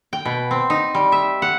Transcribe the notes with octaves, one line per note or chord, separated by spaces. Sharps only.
G5
B2
C4
D#4
G3
E5
F#5